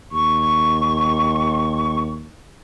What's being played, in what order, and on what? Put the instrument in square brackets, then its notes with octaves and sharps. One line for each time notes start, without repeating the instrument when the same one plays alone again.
[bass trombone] D#2 [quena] C#6